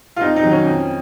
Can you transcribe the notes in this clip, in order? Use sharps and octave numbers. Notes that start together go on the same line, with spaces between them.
F4
F2 D#4
D#4
D#3 F#3
C#4
F2